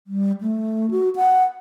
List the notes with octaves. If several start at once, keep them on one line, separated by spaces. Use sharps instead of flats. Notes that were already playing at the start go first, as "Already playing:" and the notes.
G3
A3
F#4
F#5